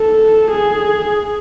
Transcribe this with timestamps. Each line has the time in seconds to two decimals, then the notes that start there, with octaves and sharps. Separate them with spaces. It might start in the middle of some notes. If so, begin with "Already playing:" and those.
Already playing: A4
0.51 G#4